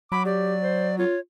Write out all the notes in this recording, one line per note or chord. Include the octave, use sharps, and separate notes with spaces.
F#3 B5 D6
G4 D5
C5
F4 C#5